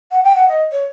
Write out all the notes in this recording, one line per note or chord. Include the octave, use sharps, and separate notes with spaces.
F#5
G5
F#5
D#5
C#5